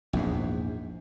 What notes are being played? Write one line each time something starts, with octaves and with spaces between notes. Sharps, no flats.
A#1 E2 G#2